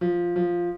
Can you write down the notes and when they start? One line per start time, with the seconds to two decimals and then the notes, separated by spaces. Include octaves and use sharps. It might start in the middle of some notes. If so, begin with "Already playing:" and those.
0.01 F3
0.36 F3